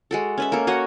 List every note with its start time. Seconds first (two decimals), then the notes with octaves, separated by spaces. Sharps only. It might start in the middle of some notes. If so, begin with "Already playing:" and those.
0.11 G#3 F#4 A4
0.38 C#4 B4 E5
0.52 A#3 A4
0.67 F#4 C#5 D#5 F#5